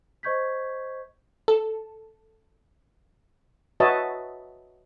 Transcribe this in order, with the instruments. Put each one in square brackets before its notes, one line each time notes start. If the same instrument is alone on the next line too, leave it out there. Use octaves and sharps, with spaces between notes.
[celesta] C5 D#5 C#6 G6 G#6 B6
[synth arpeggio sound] A4
[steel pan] F#4 B4 C#5 D#5 E5 A5